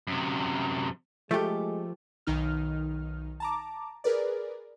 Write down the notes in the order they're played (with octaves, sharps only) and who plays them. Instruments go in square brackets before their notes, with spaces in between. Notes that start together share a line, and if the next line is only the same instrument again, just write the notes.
[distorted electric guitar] F#2 C3
[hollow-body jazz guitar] F3 G4 [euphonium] G#3 [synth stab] A3
[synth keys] B1 D#3 D#4 F6
A5 A#5 D6
G#4 A#4 B4 D5